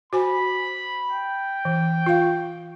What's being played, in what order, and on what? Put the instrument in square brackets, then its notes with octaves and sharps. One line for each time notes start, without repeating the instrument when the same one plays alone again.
[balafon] F#4 C5 G#5 [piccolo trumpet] B5
[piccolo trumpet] G5
[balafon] E3
F4 F5